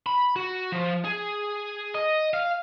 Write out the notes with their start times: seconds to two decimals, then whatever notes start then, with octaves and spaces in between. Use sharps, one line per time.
0.06 B5
0.36 F#4
0.72 F3
1.04 G#4
1.95 D#5
2.33 F5